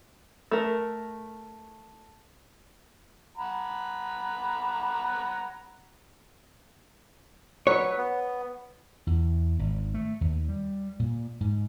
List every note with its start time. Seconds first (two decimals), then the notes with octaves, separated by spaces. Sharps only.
0.51 A3 A#4
3.38 F#5 A#5 B5
7.67 F#3 B4 C#5
7.98 B3
9.07 E2
9.59 G#1
9.94 A3
10.21 D#2
10.48 G3
10.99 A#2
11.41 G#2